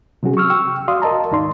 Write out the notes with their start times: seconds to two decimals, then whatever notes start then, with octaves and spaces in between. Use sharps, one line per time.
0.23 C3 F#3 C#4 F#4 G#4
0.37 C#6 E6 F6
0.50 G5 C#6 E6
0.88 F#4 D5 F5 C6 D#6
1.02 A#4 D#5 A5 A#5
1.31 D#2 G#2 D#4 D5 C6